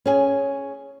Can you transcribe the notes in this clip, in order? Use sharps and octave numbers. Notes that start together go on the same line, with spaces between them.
C#4 G#4 G#5